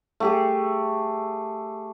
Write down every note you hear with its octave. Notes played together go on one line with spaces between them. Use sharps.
A3 G4 G#4